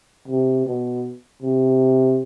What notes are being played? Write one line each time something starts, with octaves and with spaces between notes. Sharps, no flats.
C3
B2
C3